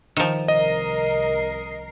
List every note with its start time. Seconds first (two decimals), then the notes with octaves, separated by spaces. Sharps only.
0.17 D#3 F3
0.48 C2 A#4 D#5 C7